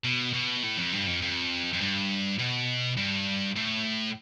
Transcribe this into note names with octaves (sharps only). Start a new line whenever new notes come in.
B2
B2
A2
F2
G2
F2
F2
F2
G2
B2
G2
A2